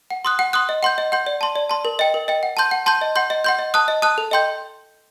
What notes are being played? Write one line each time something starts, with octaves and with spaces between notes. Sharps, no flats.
F#5
C6 D#6 F#6
F#5
C6 D#6 F#6
D#5
F#5 C6 G6
D#5
F#5 C6 G6
D5
A5 C6
D5
A5 C6
A#4
D#5 G5
A#4
D#5 G5
F#5
A5 C6 G6
F#5
A5 C6 G6
D#5
F#5 C6 G6
D#5
F#5 C6 G6
D#5
A5 D#6 F#6
D#5
A5 D#6 F#6
A4
D#5 G5 C6 G6